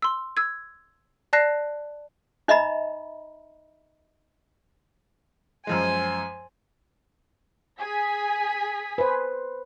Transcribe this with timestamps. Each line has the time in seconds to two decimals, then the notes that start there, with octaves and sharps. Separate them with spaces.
0.02 C6 E6
0.37 E6 G#6
1.33 D5 A5 F#6 A#6 C7
2.48 D#4 D#5 E5 A#5 B5
5.67 F#2 F3 G#3 C5 G#5
7.78 G#4 G#5 B6
8.98 B4 C5